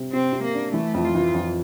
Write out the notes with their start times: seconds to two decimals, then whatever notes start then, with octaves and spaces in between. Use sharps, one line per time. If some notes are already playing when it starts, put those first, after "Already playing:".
Already playing: C3 G3
0.13 C3 C4
0.33 C3
0.44 A#3
0.54 D4
0.74 E3 A3
0.94 F2
1.05 F4
1.15 E3
1.35 F2